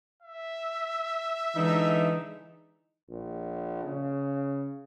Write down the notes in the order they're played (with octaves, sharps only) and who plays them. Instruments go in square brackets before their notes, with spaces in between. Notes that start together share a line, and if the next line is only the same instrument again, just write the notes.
[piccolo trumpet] E5
[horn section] D3 G#3 D#4 [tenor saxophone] E3
[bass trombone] A#1
C#3